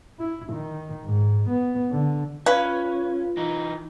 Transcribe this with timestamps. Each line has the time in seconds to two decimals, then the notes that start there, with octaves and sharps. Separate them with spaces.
0.19 E4
0.53 D#3
1.05 G#2
1.48 B3
1.91 D3
2.46 C#4 F4 B4 D5 F5 E6
3.37 E3 D#4